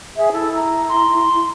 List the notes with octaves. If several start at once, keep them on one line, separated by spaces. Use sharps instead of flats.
G#4 E5
E4 A4
A#5
C6